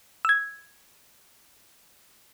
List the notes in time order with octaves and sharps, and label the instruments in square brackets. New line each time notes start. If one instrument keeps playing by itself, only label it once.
[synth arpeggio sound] E6 G#6